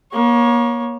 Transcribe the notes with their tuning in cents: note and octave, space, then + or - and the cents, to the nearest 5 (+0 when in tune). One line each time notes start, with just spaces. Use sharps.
A#3 +35 C#5 +0